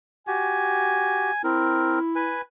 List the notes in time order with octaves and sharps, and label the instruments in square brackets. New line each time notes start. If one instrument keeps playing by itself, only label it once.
[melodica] F#4 G4 [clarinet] G#5
[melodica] C4 A#4 [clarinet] E4
[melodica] B4 G#5